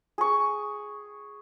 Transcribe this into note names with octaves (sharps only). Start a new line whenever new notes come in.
G#4 C#6